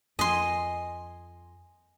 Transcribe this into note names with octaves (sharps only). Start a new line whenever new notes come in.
F2 D#5 G#5 C6